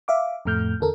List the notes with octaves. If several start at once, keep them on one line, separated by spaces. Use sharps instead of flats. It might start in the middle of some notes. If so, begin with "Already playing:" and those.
E5 F5 D6
F2 A2 A3 F6 G6
E2 D3 A4 A#4